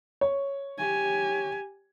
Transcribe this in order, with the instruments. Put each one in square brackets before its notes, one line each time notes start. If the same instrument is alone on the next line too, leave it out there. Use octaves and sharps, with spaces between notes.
[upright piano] C#5
[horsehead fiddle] G4 G#5